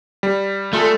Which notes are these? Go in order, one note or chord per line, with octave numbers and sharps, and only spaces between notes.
G3
A3 F4 G#4 A4